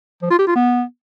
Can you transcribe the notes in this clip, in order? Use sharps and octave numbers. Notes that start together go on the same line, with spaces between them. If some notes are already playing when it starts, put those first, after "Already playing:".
F3
F4
G4
F4
B3